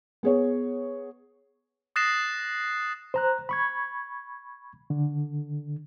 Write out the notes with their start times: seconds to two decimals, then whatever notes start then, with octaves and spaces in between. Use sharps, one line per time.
0.23 B3 G#4 C#5
1.96 D#6 F#6 A6 A#6 C7 E7
3.14 C5 A#5 F#6
3.49 B5 C#6 G#6
4.90 D3